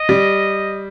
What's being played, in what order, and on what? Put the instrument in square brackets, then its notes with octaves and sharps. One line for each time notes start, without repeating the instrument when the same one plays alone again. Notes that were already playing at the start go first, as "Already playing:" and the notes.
Already playing: [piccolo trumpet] D#5
[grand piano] G3